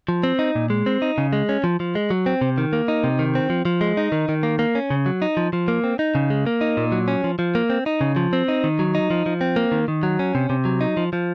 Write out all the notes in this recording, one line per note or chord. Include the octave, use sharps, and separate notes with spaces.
F3
C4
D#4
A#2
G#3
C4
D#4
C#3
G#3
C#4
F3
F3
G#3
F#3
C4
C3
D#3
A#3
D#4
C3
D#3
C4
F3
F3
G#3
D#4
D#3
D#3
A#3
A#3
C#4
C#3
F#3
D#4
F3
F3
A#3
C4
D#4
C#3
G#3
A#3
D#4
A#2
F#3
C#4
F3
F3
A#3
C4
D#4
C#3
F3
C4
D#4
D#3
F#3
D#4
F3
F3
C4
A#3
D#3
D#3
F#3
C#4
C3
C3
F#3
D#4
F3
F3